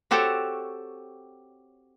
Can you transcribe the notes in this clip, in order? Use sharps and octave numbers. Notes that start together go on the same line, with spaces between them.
C4 F#4 G4 A4 C#5